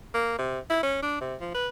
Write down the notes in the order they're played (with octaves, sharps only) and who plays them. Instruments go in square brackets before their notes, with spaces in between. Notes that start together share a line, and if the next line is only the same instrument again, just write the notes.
[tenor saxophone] A#3
C3
E4
C#4
D4
C3
F3
B4